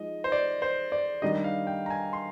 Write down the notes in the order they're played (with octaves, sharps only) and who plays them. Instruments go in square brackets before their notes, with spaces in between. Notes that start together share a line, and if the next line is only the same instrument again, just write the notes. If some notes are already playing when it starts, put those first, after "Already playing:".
Already playing: [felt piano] F3 G#3 D#4 [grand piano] D#5
[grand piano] C5
D5
C5
D5
[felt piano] D#3 G3 D4 G4 [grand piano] D#5
[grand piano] F5
G5
A#5
G#5
C6